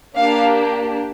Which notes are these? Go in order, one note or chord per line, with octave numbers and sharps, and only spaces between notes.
A#3 D4 G4 F5